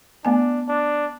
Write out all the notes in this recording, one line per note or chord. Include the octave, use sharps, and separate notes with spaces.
A3 B3 D4 G#5
D4